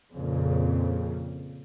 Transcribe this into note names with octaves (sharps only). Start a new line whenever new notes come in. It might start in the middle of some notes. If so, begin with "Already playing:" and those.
F2 A#2 C#3